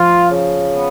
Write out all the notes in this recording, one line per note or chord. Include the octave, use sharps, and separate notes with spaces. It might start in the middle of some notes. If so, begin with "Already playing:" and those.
Already playing: F3 F4
C#3
B3